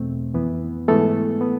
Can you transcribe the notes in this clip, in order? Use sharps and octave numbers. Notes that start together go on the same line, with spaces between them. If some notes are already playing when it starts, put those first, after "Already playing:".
Already playing: E2 B2 A3 C4
F2 E3 B3
G#2 E3 G#3 A3 B3 A4
B3